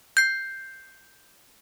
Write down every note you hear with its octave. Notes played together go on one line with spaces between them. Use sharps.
G6 C7